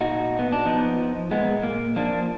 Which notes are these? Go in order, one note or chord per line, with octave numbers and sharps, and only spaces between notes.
A#2 D#4 F#4
A#2
B3
D4
F3 B3 D#4
F3
A#2 G#3 B3
A#2 A#3
F3 A#3 D4